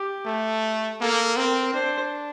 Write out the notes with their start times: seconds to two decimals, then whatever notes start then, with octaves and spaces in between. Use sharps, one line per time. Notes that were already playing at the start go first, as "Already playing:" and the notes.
Already playing: G4
0.26 A3
1.00 A#3 A4
1.36 C4 A#4
1.73 D4 C5